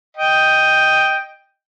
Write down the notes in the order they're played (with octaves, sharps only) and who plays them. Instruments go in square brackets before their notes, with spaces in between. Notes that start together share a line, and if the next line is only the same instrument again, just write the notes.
[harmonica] D#5 G5